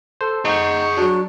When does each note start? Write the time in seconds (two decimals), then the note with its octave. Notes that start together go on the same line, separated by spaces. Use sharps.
0.21 A4 C5
0.45 D#4 G#4 F#5 C#6
0.97 F#3 D4 F#4